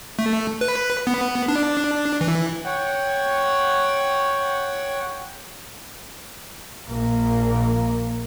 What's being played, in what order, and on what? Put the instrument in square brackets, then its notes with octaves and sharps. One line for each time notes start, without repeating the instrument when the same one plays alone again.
[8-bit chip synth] A3
B4
B3
D4
E3
[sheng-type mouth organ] C#5 F#5 G5
[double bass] A#1 A#3